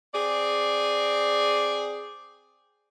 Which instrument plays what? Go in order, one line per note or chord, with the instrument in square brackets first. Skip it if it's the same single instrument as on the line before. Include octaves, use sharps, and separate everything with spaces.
[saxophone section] C4 G#4 D5